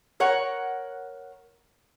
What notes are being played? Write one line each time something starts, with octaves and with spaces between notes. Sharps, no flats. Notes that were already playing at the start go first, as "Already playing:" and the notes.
A#4 C#5 F#5